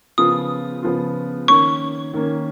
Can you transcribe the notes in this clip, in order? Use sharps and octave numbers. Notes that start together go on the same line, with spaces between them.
C#3 F3 B3 F4 D#6
C#3 F3 B3 F4
D#3 A#3 C#4 C#6
D#3 A#3 C#4